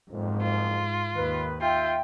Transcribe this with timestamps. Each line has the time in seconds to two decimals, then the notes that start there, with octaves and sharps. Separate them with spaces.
0.10 F#1 F2 G#2
0.42 F4
1.16 D#2 D#3 B4
1.61 F4 E5 G5